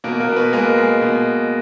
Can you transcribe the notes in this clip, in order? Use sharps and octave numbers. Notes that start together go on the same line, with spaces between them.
B2 A#3 A#4
A#3 A#4
B2
B3 B4
G#3 A#3 A#4
G#3
B2